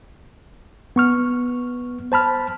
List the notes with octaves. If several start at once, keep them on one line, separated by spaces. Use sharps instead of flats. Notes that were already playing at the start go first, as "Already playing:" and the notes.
B3 C#6 F6
C5 A5 B5 F6